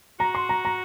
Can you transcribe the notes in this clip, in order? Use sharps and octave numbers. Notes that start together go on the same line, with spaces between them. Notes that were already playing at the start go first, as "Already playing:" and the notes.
F#4 A#5
C6
A#5
A#5